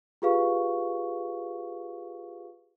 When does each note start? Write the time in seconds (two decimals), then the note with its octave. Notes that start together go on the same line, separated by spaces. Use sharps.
0.22 F4 G4 G#4 B4 F5 C#6